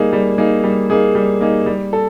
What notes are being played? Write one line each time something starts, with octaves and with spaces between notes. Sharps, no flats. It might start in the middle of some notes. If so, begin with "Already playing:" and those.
Already playing: G3 A#3 D#4 G#4
G3
A#3 D#4 G#4
G3
A#3 D#4 G#4
G3
A#3 D#4 G#4
G3
A4